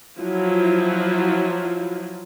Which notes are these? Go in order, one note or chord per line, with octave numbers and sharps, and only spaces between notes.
F3 F#3 E4 F4